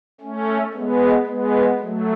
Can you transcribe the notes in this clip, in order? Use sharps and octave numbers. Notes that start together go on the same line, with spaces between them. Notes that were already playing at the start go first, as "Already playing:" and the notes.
A3 C#4
G#3 B3
G#3 B3
F#3 A3